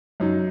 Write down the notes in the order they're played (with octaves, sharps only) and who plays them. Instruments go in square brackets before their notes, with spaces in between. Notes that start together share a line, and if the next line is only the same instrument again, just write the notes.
[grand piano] F#2 F#3 D#4